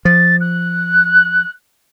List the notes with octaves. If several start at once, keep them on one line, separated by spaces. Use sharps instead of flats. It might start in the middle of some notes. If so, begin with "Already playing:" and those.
F3 A6
F#6